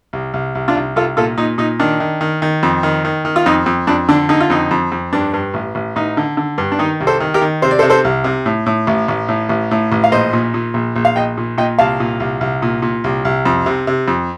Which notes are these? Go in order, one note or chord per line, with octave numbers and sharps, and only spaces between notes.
C2
C2
C2
D4 F4
C2
C2 F4 A4
A#2 F4 A4
A#2 D#4
A#2 D#4
D#3 D4
D#3
D#3
D#3
F2
D#3
D#3
D#3
F4
F2 D#4
F2
F2 D4
D3 D4
D3 D#4
F4
F2 D#4
F2
F2
G2 D4
G2
A1
A1
A1 D#4
D3
D3
G2
D4
D#3 D#4
C2
A4 C5
D#3
G4 A#4
D#3
C3 C5
D5
A4 C5
C3
A4 C5
C2
C3
A2
A2
A1
A1
A2
A1
A2
A1
F5
A#1 C5 D#5
A#2
A#2
A#1
A#1
F5
A#1 D#5 G5
A#2
A#2 D#5 G5
C2 F5 A5
A#2
C2
C2
A#2
A#2
C2
C2
F2
C3
C3
F2